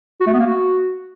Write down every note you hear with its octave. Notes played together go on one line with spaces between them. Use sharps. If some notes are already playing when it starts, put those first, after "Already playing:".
F#4
A3
B3
A#3
F#4